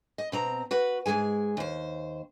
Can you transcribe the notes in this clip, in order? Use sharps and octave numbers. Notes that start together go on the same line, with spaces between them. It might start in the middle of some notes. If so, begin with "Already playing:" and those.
D#5
B2 C4 A#5
F#4 B4 F#5
G#2 C3 G#3 G#4 G#5
D#2 C5